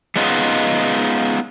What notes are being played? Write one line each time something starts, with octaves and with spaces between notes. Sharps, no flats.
G#3 B3 C#4 D#4 F4